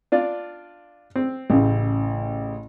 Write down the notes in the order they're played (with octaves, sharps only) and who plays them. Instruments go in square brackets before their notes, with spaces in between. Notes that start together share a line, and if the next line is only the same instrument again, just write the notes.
[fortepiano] D4 F4 D5
C4
[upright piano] A1 C#3